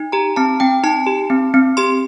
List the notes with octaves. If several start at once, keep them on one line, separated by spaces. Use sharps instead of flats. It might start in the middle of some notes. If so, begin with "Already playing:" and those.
Already playing: D#4
G4 A#5
C4 A5
C4 G5
D#4 A5
G4
C4
C4
G4 C6